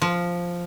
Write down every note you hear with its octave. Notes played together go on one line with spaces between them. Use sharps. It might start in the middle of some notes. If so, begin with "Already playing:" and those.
F3